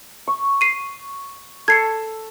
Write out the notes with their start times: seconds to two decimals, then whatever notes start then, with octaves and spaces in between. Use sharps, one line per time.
0.27 C#6
0.61 C7 D#7
1.68 A4 G#6 C7 C#7